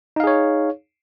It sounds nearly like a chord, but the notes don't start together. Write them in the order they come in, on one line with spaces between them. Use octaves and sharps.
D#4 F5 G#4 C#5